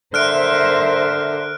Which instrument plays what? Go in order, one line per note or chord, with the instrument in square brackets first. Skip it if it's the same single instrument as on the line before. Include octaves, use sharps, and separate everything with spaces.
[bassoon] D3 [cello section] A#4 C5 E5 [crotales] F6 F#6 D7